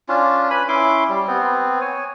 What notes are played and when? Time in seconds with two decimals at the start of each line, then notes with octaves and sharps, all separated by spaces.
0.09 C#4 D4 F4
0.50 B4 G#5 B5
0.68 C#4 E4 C6 D6
1.09 G3
1.27 B3 C4
1.81 C#5 G#5